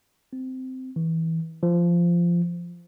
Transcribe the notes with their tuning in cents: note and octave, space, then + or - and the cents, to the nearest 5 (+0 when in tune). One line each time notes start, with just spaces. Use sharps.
C4 -15
E3 -20
F3 -15